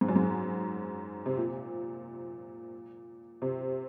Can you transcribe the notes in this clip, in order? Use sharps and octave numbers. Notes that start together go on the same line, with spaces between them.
G#2
F#2
G#2
C3
A#2
C3